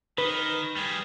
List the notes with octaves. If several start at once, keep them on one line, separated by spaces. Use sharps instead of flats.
D#3 B4
G3 G#4